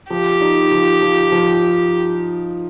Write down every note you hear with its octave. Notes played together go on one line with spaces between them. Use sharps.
F3 G4
D#4
F3
F3
F3